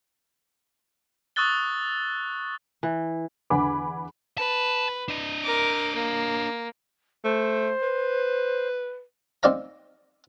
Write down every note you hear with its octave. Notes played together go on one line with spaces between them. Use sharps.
C#6 D#6 E6 F#6 A6 G7
E3
E2 D3 F#5 G#5 B5 D6
B4 A5
D4 D#5
A#4 D6
A#3
A3 C5
B4
C4 D#4 D5 F5 A#5